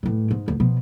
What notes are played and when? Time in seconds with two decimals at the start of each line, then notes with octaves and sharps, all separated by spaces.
0.03 A2 E3
0.31 G#2
0.48 D2
0.60 B2 F3